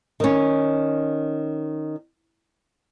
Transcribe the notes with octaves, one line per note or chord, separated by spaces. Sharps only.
D#3 C#4